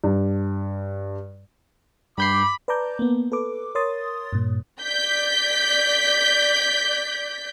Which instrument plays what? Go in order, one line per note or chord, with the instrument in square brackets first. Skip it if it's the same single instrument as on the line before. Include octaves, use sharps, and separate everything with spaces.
[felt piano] G2
[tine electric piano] G2 G6 C7 [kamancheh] B5 [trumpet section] D6
[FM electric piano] B4 D5 A5 A#5 D6 G6
A#3 B3
A4 B4 D6
A#4 C#5 C6 D#6 A6
G2 A#2
[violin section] D5 G6 B6